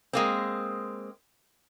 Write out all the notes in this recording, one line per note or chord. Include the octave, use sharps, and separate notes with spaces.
G#3 A#3 C4